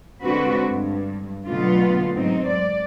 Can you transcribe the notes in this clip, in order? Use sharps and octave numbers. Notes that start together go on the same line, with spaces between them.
D3 G#3 C4 F#4 B4
G2
B2 D3 F#3 A3 B3 F4
G#2 F#3 C4 D#4
D5